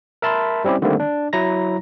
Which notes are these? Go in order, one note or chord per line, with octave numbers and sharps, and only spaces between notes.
A#4 E5 A5 B5 C6
G3 C4 C#4 E4 G4
D3 D#3 G3 A3 A#3 C4
D4
F#3 E4 A#5 A#6